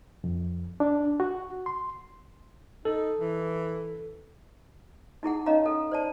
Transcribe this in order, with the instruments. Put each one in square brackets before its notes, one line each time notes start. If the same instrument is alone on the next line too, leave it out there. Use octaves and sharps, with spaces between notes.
[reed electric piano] F2
D4
F#4
C6
[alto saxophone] D#4 [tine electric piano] A4
[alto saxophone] E3
[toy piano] D#4 E4 G#4 F#5
C#4 D#4 C#5 D#5 F5 A#5
A4
C5 D5 A5